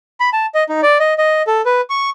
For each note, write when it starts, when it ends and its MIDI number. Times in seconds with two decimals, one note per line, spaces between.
0.20 0.30 83
0.33 0.46 81
0.54 0.64 75
0.69 0.81 63
0.83 0.98 74
1.00 1.14 75
1.18 1.42 75
1.47 1.62 69
1.66 1.81 71
1.90 2.10 85